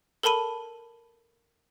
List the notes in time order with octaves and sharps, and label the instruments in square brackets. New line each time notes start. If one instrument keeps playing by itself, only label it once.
[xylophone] A4 A#4 A5 B5 D#7